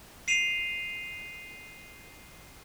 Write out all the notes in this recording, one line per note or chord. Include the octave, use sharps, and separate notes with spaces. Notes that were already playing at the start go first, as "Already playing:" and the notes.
C7 D#7 F7